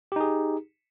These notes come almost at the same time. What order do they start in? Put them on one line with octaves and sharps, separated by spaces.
G4 D#4 G#4